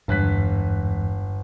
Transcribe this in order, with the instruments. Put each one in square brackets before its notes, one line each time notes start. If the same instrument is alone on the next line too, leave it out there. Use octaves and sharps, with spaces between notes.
[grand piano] G1 F#6 B6 [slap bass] E2 G#2